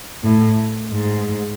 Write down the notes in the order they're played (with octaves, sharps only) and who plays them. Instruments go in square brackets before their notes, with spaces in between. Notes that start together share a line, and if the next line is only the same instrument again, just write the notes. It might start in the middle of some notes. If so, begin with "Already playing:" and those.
[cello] A2
G#2